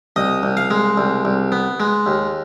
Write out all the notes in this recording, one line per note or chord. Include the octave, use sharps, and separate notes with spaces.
C2 D#5
C2
F5
G#3
C2
C2
B3
G#3
D#2